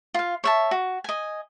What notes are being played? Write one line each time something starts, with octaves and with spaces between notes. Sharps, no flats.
F4 F5
C#5 E5 A5
F#4
D#5 G#5